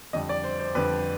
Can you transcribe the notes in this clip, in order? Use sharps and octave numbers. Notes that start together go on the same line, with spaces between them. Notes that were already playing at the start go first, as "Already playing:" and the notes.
F2 D3 G3 D#5
D5
C5
C5
F2 D3 G3 B4